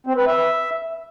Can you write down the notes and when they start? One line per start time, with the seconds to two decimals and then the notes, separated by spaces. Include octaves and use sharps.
0.07 C4
0.17 B4
0.27 E5